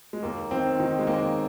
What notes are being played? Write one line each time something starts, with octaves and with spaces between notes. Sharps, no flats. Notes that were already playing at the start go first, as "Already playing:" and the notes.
G#3
D#2 A#3
D#3 C4
D#3 D#4
G#3
D#2 A#3